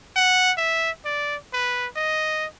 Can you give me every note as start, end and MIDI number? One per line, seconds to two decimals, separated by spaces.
0.16 0.51 78
0.58 0.90 76
1.05 1.36 74
1.53 1.87 71
1.96 2.46 75